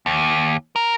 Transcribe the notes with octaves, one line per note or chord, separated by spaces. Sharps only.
D#2
A#4